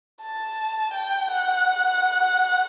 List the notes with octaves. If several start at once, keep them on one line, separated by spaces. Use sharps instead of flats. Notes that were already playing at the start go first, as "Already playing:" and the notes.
A5
G5
F#5